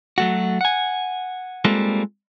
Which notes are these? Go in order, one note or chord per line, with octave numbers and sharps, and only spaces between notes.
F#3 A3 F#4
F#5 G#5
G3 G#3 A#3 C4 F4 A4